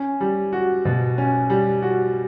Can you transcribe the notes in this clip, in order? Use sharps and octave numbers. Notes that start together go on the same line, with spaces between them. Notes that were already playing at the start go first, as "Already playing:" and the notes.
Already playing: C#4
G3
F#4
B2
C#4
G3
F#4